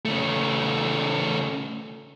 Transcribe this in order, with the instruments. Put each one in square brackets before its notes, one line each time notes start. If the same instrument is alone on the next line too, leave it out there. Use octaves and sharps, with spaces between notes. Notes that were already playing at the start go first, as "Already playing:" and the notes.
[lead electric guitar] C#3 A3